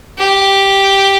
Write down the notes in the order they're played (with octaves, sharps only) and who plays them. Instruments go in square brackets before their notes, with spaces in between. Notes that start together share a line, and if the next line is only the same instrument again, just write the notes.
[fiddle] G4